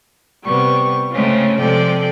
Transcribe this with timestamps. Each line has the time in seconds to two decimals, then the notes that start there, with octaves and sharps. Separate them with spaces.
0.45 C3 G3 B3 C#6
1.12 C#3 G#3 A3 C4 C#4 F4
1.61 C3 F3 G#3 A4 D5 G5